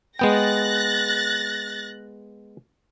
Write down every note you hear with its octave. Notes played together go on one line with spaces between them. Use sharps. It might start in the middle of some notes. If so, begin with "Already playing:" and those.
G#3 B3 G5 F#6 A6 A#6